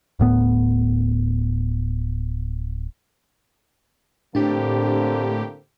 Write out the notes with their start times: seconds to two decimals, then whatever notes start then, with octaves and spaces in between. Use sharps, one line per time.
0.19 D1 A2 B3
4.35 A2 D3 A#3 C4 D4 G4